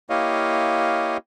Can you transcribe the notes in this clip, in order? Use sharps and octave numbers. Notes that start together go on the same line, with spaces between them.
A#3 E4 G4 C#5 D#5 F5